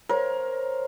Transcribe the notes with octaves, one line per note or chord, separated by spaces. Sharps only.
A#4 C5 C#5